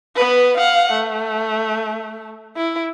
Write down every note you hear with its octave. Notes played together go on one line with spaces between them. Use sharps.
B3 B4
F5 F#5
A3
E4